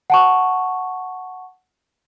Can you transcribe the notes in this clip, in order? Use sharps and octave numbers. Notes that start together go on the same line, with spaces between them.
F#5 A5 C#6